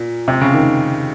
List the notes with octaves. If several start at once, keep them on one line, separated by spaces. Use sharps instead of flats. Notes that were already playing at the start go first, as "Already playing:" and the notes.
Already playing: A#2
C3
C#3
D#3